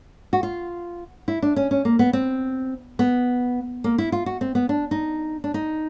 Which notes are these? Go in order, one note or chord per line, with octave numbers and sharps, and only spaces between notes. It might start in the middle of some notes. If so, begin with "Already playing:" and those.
F#4
F4
E4
D4
C#4
C#4
A#3
B3
C4
B3
A#3
E4
F4
F#4
C4
B3
D4
D#4
D4
D#4